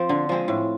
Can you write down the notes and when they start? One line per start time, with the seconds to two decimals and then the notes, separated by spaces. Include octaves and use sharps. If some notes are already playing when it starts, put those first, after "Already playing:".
Already playing: F3 C4
0.09 D3
0.29 F3 G#3 C4
0.48 A2